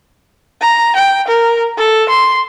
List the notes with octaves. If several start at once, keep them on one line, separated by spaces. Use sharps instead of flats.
A#5
G5
A#4
A4
C6